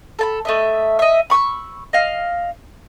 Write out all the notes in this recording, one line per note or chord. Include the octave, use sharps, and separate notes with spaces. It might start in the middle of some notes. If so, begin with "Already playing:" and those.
A4 A5 B5
A3 D#5 E5
D#5 E5
B5 C#6 D#6 E6
D#5 F5